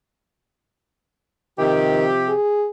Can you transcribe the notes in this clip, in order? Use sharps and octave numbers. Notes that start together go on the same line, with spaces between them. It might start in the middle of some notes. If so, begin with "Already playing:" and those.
C3 D#3 F3 G4
G#4